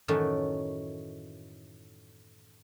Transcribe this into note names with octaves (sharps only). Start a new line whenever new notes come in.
F#2 A2 D#3 E3 A3 C#4